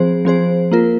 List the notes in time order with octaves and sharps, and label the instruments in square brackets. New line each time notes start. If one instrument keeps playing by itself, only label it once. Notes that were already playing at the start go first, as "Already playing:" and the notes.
Already playing: [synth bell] F3 C4 G#4 C5
F3 C4 G#4 C5
A#3 F4 A#4